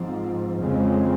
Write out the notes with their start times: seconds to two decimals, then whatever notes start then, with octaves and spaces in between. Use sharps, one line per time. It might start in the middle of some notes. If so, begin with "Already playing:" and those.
Already playing: G#2 F3 C4
0.61 F2 C#3 G#3 C4